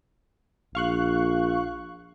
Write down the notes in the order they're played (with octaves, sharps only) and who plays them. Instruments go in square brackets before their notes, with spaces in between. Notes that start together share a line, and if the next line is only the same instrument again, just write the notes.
[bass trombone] A#1 [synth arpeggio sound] F5 C#6 F#6